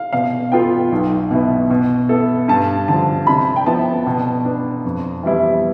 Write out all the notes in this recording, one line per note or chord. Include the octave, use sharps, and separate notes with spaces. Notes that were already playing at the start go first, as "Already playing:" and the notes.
Already playing: F5
B2 F5
B3 F4 A4 G5
B1
B2 B3 E4 B4
B2
B3 E4 A4
G2 A5
D3 F3 A5
C3 B5
G5
F3 B3 E4 A5
B2
B3 D4
F2
E3 G3 B3 E4